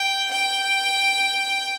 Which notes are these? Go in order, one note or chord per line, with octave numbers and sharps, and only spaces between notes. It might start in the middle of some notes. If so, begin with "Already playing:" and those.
Already playing: G5
G5